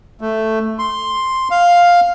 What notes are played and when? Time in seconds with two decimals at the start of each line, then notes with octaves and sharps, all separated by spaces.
0.21 A3
0.79 C6
1.51 F5